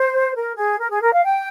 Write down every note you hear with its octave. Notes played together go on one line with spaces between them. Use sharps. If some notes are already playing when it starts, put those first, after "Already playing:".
Already playing: C5
A#4
G#4
A#4
G#4
A#4
F5
G5